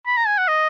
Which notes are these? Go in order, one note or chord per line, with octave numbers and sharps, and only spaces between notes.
B5
A#5
G#5
F#5
D#5